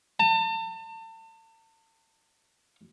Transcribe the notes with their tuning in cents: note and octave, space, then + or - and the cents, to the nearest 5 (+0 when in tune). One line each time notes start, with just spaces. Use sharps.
A5 +35